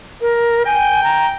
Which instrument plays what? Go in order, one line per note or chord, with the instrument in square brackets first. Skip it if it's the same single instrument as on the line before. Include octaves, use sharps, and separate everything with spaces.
[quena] A#4
[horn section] G5 [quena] G#5
[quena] A#5